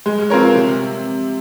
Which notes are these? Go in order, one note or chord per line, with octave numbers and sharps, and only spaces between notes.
G#3
C4 F4 A#4 C#5
C3